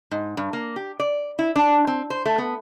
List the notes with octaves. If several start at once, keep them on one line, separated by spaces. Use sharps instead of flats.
G#2
G2
A#3
G4
D5
E4
D4
C4
C5
A3
B3